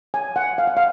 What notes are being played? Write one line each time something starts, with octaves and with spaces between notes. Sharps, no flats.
G#5
F#5
F5
F#5
F5